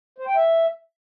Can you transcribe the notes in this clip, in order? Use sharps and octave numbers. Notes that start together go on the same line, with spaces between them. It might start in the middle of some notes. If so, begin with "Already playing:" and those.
C5
G5
E5